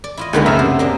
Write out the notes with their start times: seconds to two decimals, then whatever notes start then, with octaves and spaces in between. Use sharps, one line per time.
0.04 D5
0.17 E4 F4 D#5
0.33 C#2 D3 D#3 G#3 A#3 B3
0.46 F#2 C#3 A3 E5
0.59 C3 C5
0.79 A#3 D4 G#4